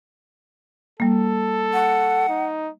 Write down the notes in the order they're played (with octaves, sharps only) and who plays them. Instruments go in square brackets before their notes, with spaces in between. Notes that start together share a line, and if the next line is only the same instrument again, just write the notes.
[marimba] G3 A#3 [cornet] A4
[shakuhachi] F#5
[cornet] D#4